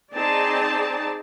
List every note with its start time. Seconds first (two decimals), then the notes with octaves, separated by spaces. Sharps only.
0.13 C4 D#4 G#4 D5 A5